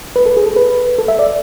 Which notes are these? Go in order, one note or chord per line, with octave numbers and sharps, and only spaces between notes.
B4
A4
G#4
A4
B4
A4
E5
D5